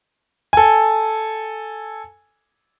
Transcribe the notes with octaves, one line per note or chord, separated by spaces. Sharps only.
A4 G#5